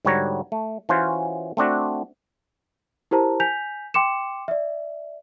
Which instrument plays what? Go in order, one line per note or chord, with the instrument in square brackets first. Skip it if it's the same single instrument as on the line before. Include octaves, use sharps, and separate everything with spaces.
[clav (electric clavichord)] G#2 D3 G3 F#4 C#5 A#5
A3
E3 C#4 F4 F#4 C5 C#5
A3 C4 D4 F#4
[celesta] E4 G4 A#4 C5 A5 A#5
G#5 G6 B6 F7
G5 C6 D6 C#7 E7
D5 E5